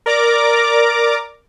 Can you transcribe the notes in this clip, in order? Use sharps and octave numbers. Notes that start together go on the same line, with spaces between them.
A#4 D5 A#5 D6